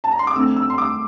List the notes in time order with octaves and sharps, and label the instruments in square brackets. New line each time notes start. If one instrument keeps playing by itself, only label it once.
[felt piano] A5
A#5
C6
D6
F2 D3 A3 C4 E6
E6
C6
D6